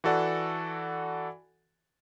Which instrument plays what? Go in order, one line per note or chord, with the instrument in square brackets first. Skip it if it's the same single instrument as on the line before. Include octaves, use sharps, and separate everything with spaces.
[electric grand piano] E3 F#4 A4 D5 F#5